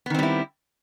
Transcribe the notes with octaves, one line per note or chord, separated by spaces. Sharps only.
D#3 G3 B3 C4 E4